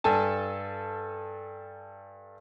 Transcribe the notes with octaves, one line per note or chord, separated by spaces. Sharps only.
G2 A4 G#5 A5